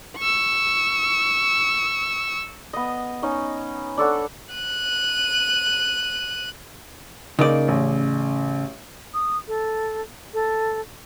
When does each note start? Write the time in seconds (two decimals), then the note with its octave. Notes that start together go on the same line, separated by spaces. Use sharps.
0.18 C#6 E6
2.73 B3 D#5
3.22 C#4 D#4 D#5
3.97 D4 A4 C#5 F#5
4.54 F#6 D#7
7.39 C#3 A#3 D#4 D5
7.68 A1
9.14 D#6
9.48 A4
10.34 A4